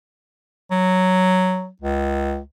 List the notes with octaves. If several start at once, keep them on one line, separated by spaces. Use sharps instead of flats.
F#3
C#2